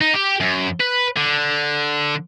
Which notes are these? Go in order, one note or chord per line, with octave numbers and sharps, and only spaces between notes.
D#4
G4
F#2
B4
D3